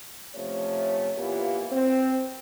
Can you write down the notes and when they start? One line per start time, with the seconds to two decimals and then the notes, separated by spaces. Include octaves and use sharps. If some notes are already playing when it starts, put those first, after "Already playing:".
0.35 C3 F3 A3 C#4 C#5
1.17 A#2 E3 A#3 B3 F4 G4
1.71 C4